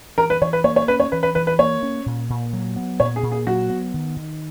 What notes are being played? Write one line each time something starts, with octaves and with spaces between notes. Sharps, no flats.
E3 A#4
B4
E3 C#5
B4
A#3 C#5
C#5
C#4 B4
C#5
E3 B4
B4
E3 B4
B4
A#3 C#5
C#4
A#2
A#2
F#3
B3
A#2 C#5
G#4
A#2
G#4
F#3 F#4
B3
D#3
D#3